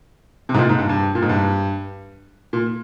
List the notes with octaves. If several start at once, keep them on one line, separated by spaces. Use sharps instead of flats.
C3
G#2
A#2
G#2
G2
G2
A#2
G#2
G2
A#2